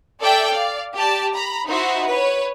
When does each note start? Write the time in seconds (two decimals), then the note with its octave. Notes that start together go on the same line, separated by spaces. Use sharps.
0.21 A4 D5 E5 G5
0.50 D5 F5
0.94 G4 D5 A5
1.33 A#5 B5
1.66 D#4 E4 F#4 C5 E5
2.06 B4 C#5